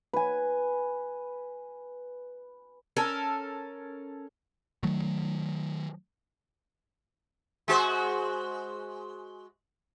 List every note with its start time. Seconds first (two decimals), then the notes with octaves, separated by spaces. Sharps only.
0.13 B4 G#5
2.96 C#4 A4 A#4
4.83 D#3 F#3 A3
7.68 G#3 F#4 C5